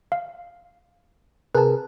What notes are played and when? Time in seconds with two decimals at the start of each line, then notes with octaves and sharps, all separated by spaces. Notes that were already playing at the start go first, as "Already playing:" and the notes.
0.12 F5
1.55 C3 G#4 A#4 B4 A5